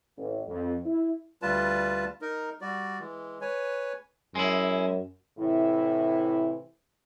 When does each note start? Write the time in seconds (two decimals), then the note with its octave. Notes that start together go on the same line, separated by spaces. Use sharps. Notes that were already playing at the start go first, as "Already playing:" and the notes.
0.17 A1
0.48 F2
0.86 E4
1.42 D2 G3 F4 B4 A5
2.22 D#4 A#4
2.61 G3 F#4 D5
3.00 E3 G#3
3.41 B4 C#5 G#5
4.35 F#2 G#3 E4
5.39 A2 C3 E3 E4